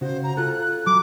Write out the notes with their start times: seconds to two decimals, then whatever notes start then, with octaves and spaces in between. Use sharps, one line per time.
0.01 C#3 F#4 C5
0.24 A#5
0.37 F4 A4 F#6
0.87 F#3 D6